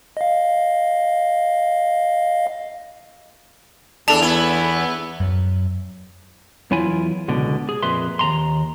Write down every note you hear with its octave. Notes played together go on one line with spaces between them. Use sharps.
D#5 F5
E2 D4 A4 A5 F7
B3 E4
F#2
E2 F#3 E4 F4 G#5
C#2 B2 D3
G#4
F2 A#2 G#4 B4 E5 C6
D#2 A#5 C6